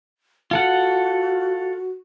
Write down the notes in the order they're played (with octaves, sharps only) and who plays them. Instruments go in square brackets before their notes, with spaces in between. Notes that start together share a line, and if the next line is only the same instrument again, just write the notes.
[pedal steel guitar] F4 A4 F#5 [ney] F#4